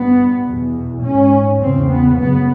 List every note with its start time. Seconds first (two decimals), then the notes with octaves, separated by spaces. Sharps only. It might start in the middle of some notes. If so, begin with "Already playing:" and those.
Already playing: G2 B3
0.45 E2 B2
1.02 G#2 C#4
1.60 E2 C#3 C4
1.89 B3
2.17 F#2 C#3 B3